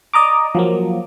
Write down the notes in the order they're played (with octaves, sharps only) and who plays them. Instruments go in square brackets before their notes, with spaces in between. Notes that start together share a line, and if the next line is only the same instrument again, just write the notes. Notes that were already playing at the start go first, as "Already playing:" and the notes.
[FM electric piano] D5 D#5 A#5 D6
F3 F#3 A#3